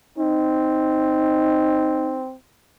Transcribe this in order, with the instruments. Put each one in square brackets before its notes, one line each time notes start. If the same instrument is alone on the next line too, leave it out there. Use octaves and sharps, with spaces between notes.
[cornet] C4 [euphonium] D#4